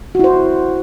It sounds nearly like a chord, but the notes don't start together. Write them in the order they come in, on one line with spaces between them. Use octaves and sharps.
F#4 E4 C5